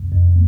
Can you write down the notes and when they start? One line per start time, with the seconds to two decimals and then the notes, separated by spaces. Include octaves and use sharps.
0.12 F2